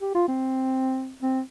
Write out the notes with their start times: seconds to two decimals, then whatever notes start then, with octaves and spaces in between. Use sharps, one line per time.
0.01 G4
0.14 F4
0.28 C4
1.22 C4